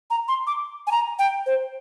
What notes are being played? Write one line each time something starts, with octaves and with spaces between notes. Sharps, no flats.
A#5
C6
D6
G#5
A#5
G5
C5